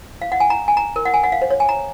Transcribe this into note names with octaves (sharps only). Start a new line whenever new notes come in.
F5
F#5
G#5
A#5
G#5
A#5
A#4
F#5
G#5
F#5
F5
C5
C#5
G#5
A#5